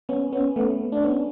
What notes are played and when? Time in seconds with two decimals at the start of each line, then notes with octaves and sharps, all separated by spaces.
0.09 B3 C#4
0.33 B3 C#4
0.56 A3 B3
0.92 D4
1.04 B3 C#4